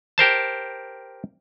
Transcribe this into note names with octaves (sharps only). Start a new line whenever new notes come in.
G4 A#4 C5 A5